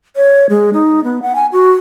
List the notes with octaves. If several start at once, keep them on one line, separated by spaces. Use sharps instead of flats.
C#5
G#3
D#4
B3
F#5
G#5
F#4